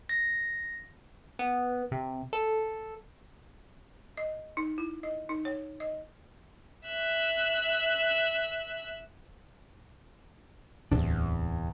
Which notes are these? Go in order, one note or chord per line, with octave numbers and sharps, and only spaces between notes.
A#6
B3
C3
A4
D#5
D#4
E4
D#5
D#4
C#5
D#5
E5 F#6
D1 E2 C3 D4